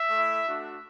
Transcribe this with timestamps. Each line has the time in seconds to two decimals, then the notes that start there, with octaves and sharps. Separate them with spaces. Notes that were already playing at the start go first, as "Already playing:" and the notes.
Already playing: E5
0.10 A3 E4
0.44 A3 D4 F#4